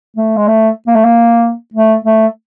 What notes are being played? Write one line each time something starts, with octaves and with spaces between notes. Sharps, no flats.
A3
G#3
A3
A#3
A3
A#3
A3
A3